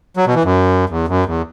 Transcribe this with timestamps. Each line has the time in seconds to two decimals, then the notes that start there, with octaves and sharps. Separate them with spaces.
0.17 F#3
0.26 B2
0.35 E3
0.44 F#2
0.90 E2
1.08 F#2
1.26 E2